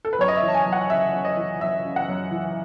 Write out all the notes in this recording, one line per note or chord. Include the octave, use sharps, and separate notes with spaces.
A4
B4
F#2 C#5
D#5
E5
E3
A5
G#5
F#2
F#5
C#3 E5
F#2
D#5
E3
F#2 E5
C#3
F#5
F#2
E3